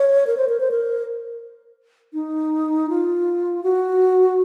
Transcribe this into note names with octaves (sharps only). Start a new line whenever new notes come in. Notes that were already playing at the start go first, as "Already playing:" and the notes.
Already playing: C#5
A#4
C5
A#4
C5
A#4
D#4
F4
F#4